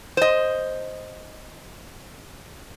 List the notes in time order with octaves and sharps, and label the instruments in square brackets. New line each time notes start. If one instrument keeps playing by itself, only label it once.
[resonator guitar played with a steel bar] C5 D#5